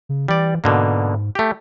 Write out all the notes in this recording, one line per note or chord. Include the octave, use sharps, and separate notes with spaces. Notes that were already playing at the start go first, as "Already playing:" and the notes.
C#3
E3 G3 D5
G#2 B2 D3 A#3
A3 G4